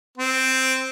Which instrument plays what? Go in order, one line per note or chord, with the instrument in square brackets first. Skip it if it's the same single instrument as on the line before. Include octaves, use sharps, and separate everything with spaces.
[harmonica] C4